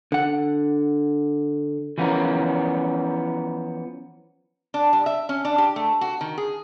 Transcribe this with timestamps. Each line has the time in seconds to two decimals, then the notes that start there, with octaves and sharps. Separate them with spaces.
0.12 D3 F#5
1.98 E3 F3 B3 C#4 A#4
4.74 D4
4.93 G3
5.06 E5
5.29 C#4
5.45 D4
5.58 G4
5.76 A3
6.01 F#4
6.21 D#3
6.38 G#4